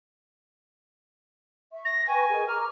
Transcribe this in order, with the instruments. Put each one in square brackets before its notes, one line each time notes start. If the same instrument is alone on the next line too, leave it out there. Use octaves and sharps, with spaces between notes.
[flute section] E5 C#6
[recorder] A#6
[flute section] B4 G5 C#6 [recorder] G#5
[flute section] G#4 A#4 D#5
[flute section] A#5 C#6 D6 [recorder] F6